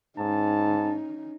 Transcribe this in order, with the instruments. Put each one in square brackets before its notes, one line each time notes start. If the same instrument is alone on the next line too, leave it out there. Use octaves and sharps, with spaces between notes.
[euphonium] G#2 [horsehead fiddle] C#4 D#4 [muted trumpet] A5